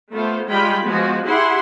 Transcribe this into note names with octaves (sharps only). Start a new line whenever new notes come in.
A3 B3 F4 C5
G3 G#3 F4 G5 B5
F3 G#3 B3 F#4
E4 G4 G#4 F#5 C6